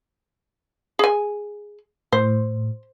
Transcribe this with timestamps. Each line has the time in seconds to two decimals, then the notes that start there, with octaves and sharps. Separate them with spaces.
0.99 G#4 G#5
2.12 A2 C5